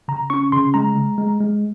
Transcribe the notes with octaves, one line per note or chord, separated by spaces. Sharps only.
C#3 A#5
C#4 C#6
C#3 C6
G#3 A#5
G#3
G#3
G#3